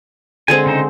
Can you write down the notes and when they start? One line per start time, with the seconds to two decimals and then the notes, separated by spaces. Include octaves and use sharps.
0.48 D3 G#3 C4 G#5
0.66 C#3 D#4 C5